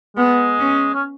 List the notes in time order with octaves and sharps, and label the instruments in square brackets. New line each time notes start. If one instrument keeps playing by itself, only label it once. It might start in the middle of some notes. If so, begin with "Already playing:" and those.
[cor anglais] G#3 [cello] B3
[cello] C#4
[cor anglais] C#4